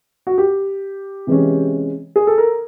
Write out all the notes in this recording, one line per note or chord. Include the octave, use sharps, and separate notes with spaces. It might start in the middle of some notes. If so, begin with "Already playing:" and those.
F#4
G4
C3 E3 G#3 C#4
G#4
A4
A#4